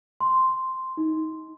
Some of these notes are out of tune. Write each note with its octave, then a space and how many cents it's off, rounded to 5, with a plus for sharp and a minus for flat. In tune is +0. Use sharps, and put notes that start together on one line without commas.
C6 -5
D#4 +25